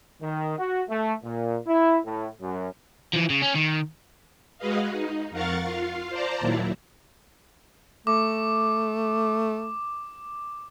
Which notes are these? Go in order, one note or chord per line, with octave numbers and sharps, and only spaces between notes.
D#3
F#4
A3
A#2
E4
A2
F#2
E3 F3
C#3
C#4
D#3
G#3 F#4 G#4 B4 D#5 F5
D#4
F2 A#4 F5 F#5 C#6 A6
F4 F5
C5 D5 A5 A#5
D#2 A#2 F#3 E4
A3 D6